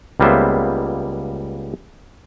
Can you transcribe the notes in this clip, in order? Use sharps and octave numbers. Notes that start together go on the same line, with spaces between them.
C#2 G3 A#3 B3 C5 E5